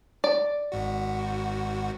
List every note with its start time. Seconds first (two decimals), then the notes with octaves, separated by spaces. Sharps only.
0.24 D5
0.72 G#1 G#2 F#4